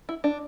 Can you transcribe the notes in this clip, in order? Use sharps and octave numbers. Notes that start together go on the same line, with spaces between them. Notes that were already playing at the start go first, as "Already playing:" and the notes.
E4
D4